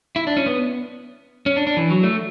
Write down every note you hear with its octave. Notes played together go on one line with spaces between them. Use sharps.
E4
D4
C#4
B3
C#4
D4
D4
E3
F#3
A3